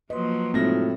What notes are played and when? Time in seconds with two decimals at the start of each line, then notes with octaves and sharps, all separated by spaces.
0.10 F3 F#3 A#3 B4 D#5 C6
0.54 A2 G#3 C4 D#4 F4 F#4 A#6